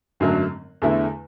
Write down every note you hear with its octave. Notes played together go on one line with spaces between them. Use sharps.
G#1 F#2 D3 F#3 A3
E2 D3 A3 E4